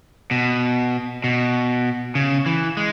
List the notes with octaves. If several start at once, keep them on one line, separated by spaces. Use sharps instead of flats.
B2
B2
C#3
E3
G#3